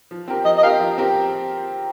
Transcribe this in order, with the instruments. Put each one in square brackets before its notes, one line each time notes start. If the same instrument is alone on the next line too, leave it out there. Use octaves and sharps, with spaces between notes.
[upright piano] F3
C4 G4 A#4
[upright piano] F3 [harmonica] D#5
[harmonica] D#5
[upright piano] C4 G4 A#4 [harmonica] F5
[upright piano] F3
C4 G4 A#4